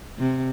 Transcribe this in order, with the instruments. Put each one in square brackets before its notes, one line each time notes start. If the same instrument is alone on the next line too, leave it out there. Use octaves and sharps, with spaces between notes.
[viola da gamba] C3